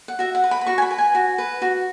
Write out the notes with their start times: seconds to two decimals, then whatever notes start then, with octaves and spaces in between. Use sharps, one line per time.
0.08 F#5
0.19 F#4 E5
0.35 F#5
0.44 B4
0.51 B5
0.61 B5
0.66 F#4 C#6
0.78 G#5
0.82 B5
0.91 B4
0.98 G#5
1.15 F#4
1.38 B4
1.62 F#4